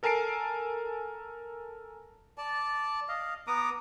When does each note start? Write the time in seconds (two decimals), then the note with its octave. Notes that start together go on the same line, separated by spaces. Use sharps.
0.03 A4 A#4 G#5 A5 C7 D7
2.38 D5 A5
3.09 D#5 F5
3.47 B3 A#5 D6 D#6